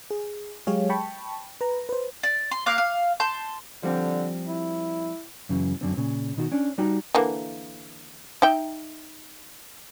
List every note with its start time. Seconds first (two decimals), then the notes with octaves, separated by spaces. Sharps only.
0.11 G#4
0.67 F#3 G#3 G4 G#4 C#5 F5
0.90 G5 A5 B5 C#6
1.61 B4 A#5
1.89 B4 C5
2.23 D5
2.51 C6
2.66 A#3 F5 D6 F#6
2.78 F5
3.20 A5 C6 G6
3.83 D3 F3 G3 C4
4.48 E4
5.49 F#2 C#3 E3
5.81 F#2 D3 C4
5.97 A#2 C#3
6.36 B2 D#3 F#4
6.52 C#4 D4
6.78 G3 D#4 F#4 G5
7.15 D3 E3 A#3
8.42 D#4 E5 G5